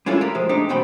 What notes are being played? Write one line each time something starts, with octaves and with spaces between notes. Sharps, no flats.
G3 G#3 C#4 E4 F4 A4
G4 A#4
A2 F3 G#3
G#3 A3 C4 D4 D#4 G4
E2 B2 A3 C4 G5 B5